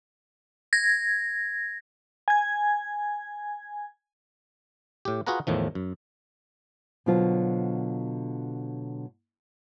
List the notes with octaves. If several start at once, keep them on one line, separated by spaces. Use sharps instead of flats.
G#6 A#6
G#5 G#6
A2 G4
F4 F#4 G#4 B4 F#5 A#5
E2 A2 D#3 F3
F#2
B2 D3 F#3 F4 C5